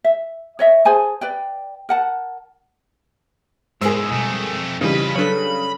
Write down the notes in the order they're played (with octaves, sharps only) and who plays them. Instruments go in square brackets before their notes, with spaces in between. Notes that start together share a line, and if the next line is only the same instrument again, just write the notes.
[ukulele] E5
C#5 D#5 E5
G#4 C5 G#5 A5
B4 D5 G5
A#4 F#5 A5
[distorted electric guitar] E2 G#2 [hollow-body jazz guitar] G#3 [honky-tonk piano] G#4 A#4 E6 [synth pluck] C5 A#5
[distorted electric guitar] F2 A3 [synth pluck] B2 G3
[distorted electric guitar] F2 B4 [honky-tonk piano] C#3 G3 [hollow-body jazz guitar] E3 D#4
[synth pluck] F#3 D4 [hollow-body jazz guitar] A4 B4 C#5 [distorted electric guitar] B5